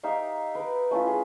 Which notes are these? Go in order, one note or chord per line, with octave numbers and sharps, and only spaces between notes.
D#4 G4 E5 F5
A#4 B4
A3 C#4 E4 F4
G#4